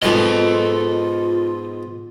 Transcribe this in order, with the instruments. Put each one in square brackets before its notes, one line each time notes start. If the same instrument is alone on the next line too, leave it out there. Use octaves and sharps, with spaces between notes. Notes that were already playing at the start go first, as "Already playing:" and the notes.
[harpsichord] G#2 B2 [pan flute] F4 [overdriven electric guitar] A4 D#5